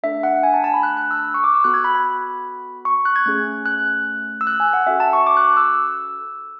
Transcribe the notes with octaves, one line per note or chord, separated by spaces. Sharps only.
A3 D4 A4 E5
F#5
G#5
A5
A5
B5
F#6
F#6
E6
C#6
D6
E6
B3 F#4 A4 F#6
G#6
B5
B5
C#6
F#6
G#6
A3 C#4 G#4
F#6
E6
F#6
G#5
F#5
C#4 F#4 A4 E5
A5
C#6
D6
F#6
D6
E6